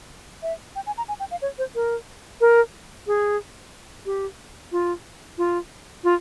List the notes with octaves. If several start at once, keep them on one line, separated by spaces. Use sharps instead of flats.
E5
G5
G#5
A#5
G#5
G5
F5
C#5
C5
A#4
A#4
G#4
G4
F4
F4
F4